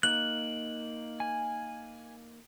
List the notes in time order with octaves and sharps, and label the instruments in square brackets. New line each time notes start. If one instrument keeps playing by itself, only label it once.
[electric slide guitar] A#3 D#4 [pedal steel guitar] F#6 [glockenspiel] F#7
[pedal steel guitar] G#5